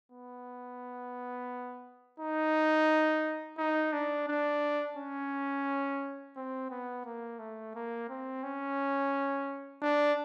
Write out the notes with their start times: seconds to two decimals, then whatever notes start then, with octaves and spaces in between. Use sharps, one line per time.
0.12 B3
2.20 D#4
3.58 D#4
3.93 D4
4.28 D4
4.97 C#4
6.36 C4
6.71 B3
7.05 A#3
7.39 A3
7.75 A#3
8.09 C4
8.44 C#4
9.82 D4